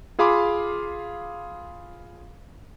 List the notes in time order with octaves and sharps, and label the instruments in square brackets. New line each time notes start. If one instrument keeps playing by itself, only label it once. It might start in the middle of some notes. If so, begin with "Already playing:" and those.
[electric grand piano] F4 G#4 F5 B5 C6 D6